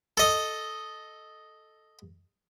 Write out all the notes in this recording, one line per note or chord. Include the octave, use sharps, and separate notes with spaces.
A4 D#5